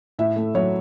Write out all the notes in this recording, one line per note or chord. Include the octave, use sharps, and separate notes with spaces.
A2 E5
A3
F#3 C#5